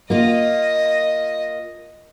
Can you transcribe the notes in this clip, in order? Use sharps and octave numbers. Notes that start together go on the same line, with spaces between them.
A#3 F4 D#5